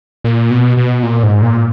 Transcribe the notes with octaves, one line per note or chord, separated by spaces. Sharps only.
A#2
B2
B2
A#2
G#2
A#2